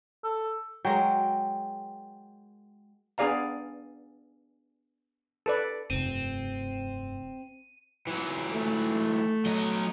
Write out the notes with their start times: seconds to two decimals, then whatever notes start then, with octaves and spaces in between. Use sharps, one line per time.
0.24 A4
0.85 F#3 G#3 A#4 G5
3.18 B3 D4 G#4 D5 F5 A#5
5.46 A4 B4 D5
5.90 F1 G2 C4 D#7
8.07 E3 F#3
8.52 A3
9.46 F#3 D#5